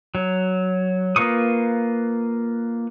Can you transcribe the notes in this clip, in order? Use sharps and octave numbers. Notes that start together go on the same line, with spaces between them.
F#3
A#3 F4 B4 C#6 D#6